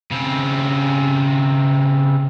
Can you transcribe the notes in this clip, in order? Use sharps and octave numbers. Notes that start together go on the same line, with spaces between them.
C#3 C4